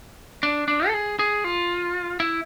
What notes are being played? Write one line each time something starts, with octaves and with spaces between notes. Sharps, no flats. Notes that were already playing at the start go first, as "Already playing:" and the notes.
D4
D4
A4
G#4
G#4
F4
E4